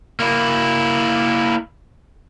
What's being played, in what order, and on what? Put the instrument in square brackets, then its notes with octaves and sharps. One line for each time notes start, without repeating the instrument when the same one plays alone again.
[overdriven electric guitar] A#3 E4